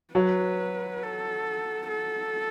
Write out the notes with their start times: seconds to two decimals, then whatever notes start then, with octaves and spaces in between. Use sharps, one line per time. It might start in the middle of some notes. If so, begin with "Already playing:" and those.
0.14 F#3 B4
1.02 A4
1.89 A4